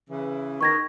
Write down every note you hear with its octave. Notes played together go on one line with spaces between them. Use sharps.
C#3 E3
D#3 C#6 G#6 A#6